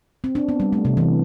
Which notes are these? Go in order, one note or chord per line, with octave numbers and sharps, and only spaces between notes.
C4
D4
B3
G3
A3
C3
E3